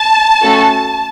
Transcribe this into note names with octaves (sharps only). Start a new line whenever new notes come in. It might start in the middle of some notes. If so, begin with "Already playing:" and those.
Already playing: A5
A3 C#4 F#4 A4